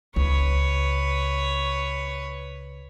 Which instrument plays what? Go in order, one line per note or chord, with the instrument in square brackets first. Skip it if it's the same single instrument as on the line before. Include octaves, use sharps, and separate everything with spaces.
[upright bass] C#2 [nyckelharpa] B4 C#5